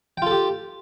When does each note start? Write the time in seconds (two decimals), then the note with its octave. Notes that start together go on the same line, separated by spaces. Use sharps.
0.17 G5
0.22 F4
0.27 A4
0.31 G4